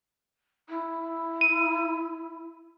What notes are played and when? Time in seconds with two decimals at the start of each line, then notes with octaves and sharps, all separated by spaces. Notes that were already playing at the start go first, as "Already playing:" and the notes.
0.69 E4
1.41 D#7